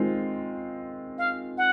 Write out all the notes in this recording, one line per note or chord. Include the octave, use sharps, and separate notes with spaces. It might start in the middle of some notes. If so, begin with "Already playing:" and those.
Already playing: D#3 G#3 C4 F4
F5
F#5